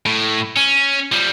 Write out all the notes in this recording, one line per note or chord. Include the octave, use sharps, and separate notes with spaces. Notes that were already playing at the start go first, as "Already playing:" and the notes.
A2
C#4
F3 G3